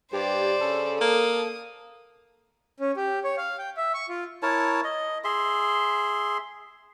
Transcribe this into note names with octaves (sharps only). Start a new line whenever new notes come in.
G2 G4 C5 D5
C#3 A4
A#3 D#6
C#4
G4
C#5
F5
G5
E5
C#6
F4
E4 A#4 C#5 A5
D#5
G#4 E5 C6